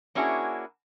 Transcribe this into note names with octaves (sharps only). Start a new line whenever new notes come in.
A#3 C#4 D4 E4 F#4 G#4